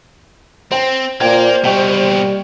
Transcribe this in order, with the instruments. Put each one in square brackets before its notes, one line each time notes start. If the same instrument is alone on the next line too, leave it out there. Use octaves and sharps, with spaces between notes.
[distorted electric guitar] C4 [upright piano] C5 G5
[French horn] A#2 [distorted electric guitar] A#3 A#4 [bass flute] C5 [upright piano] D5 G5 G#6
[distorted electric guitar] B2 A#3 [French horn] G3 [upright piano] D#5 G5 C#6